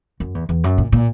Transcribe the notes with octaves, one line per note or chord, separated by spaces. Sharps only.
F#2
E2
E2
F#2
A#2
A#2